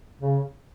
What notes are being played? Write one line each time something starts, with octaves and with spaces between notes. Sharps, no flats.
C#3